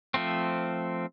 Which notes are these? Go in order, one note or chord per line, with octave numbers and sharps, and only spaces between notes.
F3 A3 C4